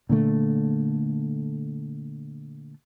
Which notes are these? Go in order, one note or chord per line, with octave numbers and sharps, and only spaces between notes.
A#2 D3 A3